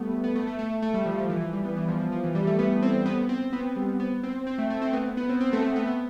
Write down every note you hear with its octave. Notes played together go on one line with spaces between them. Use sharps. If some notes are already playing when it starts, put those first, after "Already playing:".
Already playing: G3 A3 B3
B3
A3
A3
A3
A3
G3
F3
F3
E3
E3
G3
B3
E3
F3
F3
F3
E3
G3
A3
B3
C4
B3
C4
B3
G3
B3
C4
C4
A3
A3
C4
B3
B3
C4
C4
A3
A3
B3
B3